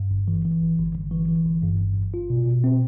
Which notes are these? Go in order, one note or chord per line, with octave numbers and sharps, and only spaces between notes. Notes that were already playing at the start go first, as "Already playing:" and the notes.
Already playing: G2
G1
E3
E3
G1
G1
G1
E3
E3
G1
G2
G1
G1
F4
B2
B2
C4